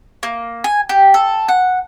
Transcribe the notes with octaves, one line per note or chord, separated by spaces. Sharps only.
A#3
G#5
G4
A4
F#5